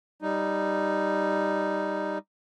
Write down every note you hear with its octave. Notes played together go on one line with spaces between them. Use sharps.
G3 D#4